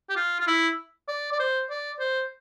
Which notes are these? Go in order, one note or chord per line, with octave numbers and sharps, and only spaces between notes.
G4
F4
F4
E4
D5
D5
C5
D5
C5